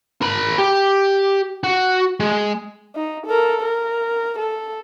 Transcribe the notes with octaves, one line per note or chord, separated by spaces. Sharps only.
A#4 B5
G4
F#4
G#3
D#4
A4 A#4
A#4
A4